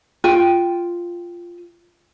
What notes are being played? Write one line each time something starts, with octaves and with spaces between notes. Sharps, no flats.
F4 G5